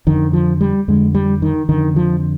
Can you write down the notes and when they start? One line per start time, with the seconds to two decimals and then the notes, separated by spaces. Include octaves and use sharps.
0.07 F2 D3 D#3
0.33 F3
0.61 G3
0.88 F2 D3 G#3
1.15 G3
1.42 D#3
1.69 F2 D3 D#3
1.96 F3